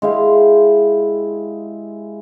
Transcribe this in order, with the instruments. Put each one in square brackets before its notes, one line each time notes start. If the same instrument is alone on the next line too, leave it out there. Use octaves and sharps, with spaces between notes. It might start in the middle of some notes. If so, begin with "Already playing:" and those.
[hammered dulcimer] G#3 E4 G4 F5